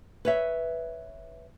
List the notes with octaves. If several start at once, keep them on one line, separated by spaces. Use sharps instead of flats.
B4 C#5 E5